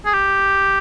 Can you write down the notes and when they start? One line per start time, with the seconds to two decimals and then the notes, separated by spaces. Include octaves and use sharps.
0.06 G#4
0.13 G4